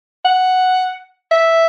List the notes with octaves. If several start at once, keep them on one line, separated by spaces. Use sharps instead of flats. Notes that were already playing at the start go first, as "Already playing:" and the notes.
F#5
E5